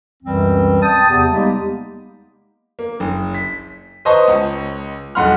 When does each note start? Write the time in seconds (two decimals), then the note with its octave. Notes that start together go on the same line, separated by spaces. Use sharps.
0.23 C#2 F#2 B2 E3 G3 C4
0.82 G5 A5 D#6
1.10 E2 C3 G4
1.31 G3 G#3 A#3 B3 D#4 G4
2.79 A#3
3.00 F#1
3.35 B6
4.05 B4 C5 D#5 A5 A#5 C#6
4.27 C#2
5.15 D#1 B1 F#5 B5 C6 F6